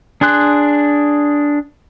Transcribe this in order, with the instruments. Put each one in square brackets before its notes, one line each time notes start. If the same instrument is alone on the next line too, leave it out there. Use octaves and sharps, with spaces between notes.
[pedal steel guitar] D4 G#4 C6 F#6